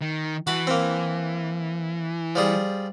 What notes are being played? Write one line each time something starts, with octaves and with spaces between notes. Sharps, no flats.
D#3
E3 F#4 A5 B5
A#3 C4
F3 G3 G#4